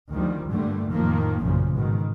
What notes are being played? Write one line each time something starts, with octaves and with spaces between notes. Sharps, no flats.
D2 D#3 F3 G3
G2 A#2 D3 G3 A3
F2 A2 D#3 F3 A#3
A1 F#2 A#2 C#3 F3
G#2 B2 D#3